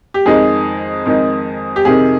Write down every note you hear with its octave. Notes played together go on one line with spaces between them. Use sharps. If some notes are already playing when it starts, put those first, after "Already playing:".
G4
F2 D#3 G#3 D#4 G#4
F2 D#3 G#3 D#4
G4
F2 C3 D#3 G#4